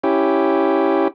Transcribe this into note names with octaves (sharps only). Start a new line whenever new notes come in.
C#4 E4 G4